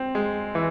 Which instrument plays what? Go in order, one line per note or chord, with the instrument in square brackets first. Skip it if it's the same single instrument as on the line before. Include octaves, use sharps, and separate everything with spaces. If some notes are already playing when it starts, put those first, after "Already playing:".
Already playing: [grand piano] C4
G#3
E3